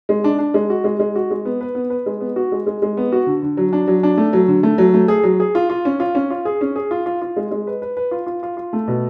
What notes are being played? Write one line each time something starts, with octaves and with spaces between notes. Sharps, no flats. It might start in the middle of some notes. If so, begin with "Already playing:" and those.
G#3
D4
D4
G#3
F#4
G#3
G#3
F#4
G#3
B3
B4
B3
B4
G#3
B3
F#4
G#3
G#3
G#3
B3
F#4
D3
D3
F#3
D4
F#3
D4
A3
F#3
D3
A3
F#3
A3
G#4
F#3
G#4
F4
F4
C#4
F4
C#4
F4
G#4
C#4
G#4
F4
F4
F4
G#3
G#3
B4
B4
B4
F4
F4
F4
F4
A3
B2